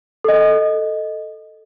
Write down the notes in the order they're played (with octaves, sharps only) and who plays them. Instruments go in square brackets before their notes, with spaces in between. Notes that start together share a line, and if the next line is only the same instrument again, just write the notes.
[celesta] A4 D#5